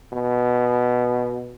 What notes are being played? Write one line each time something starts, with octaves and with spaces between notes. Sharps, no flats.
B2